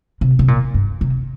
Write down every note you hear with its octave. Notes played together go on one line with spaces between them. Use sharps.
C3
C3
A#2
G2
C3